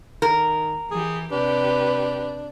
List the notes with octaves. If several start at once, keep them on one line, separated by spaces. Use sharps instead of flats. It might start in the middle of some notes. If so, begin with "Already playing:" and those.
D#3 A#4
E3 G4 G#4
C3 D4 G4 B4